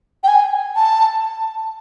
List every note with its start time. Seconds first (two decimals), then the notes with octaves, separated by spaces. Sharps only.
0.24 G5
0.28 G#5
0.76 A5